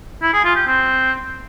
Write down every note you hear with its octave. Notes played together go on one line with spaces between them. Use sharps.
E4
G#4
F4
G4
C4